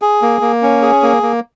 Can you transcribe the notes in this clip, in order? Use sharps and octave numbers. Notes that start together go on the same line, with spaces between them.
G#4
A#3
A#3
C#4
G#4
A#3
A#3